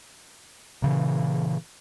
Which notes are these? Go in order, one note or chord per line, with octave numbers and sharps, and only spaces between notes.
A#2 C#3 E3